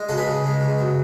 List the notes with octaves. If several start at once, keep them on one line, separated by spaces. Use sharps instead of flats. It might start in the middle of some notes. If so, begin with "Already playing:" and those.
Already playing: G#3
C#3 F#4 A4
G#4 B4
C#3
G#3
C#3
F#3